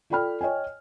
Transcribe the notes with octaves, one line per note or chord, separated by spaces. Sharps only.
F4 A4 D5 G5 B5 F6
C#5 D#5 G5 G#5